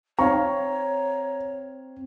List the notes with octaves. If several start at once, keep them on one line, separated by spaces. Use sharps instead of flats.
C4 C#5 F5 A#5 C#6